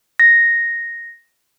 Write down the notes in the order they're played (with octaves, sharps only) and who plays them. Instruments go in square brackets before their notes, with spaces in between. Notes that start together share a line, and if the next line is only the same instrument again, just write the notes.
[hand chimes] A#6